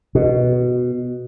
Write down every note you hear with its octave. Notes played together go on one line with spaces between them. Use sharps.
B2